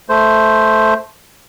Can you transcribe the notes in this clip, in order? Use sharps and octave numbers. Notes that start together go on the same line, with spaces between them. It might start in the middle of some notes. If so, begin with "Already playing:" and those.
A3 C5